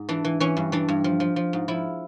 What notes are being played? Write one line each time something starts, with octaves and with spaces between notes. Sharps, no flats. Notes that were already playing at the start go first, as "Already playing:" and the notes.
Already playing: G#2
E3 D4
E3
E3 C#4
G2
E3 D4
G2
F3
F3
F3
G#2
F3 E4